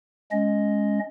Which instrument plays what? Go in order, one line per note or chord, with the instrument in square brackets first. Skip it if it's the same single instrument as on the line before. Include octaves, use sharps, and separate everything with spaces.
[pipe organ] G#3 C#4 D#5